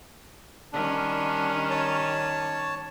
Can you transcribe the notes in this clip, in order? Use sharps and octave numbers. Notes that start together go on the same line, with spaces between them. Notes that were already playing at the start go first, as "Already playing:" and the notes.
D#3 G3 C#4 D4
C#5 A5